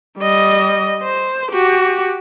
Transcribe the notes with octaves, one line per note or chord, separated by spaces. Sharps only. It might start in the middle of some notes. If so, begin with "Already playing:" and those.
G3 D#5
C5
F#4 G4